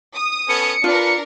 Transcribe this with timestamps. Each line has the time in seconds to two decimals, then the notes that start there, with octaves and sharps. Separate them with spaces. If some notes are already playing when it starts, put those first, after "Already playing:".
0.14 D#6
0.49 B3 C#4 A4 C#7
0.84 D4 F4 A#4 B4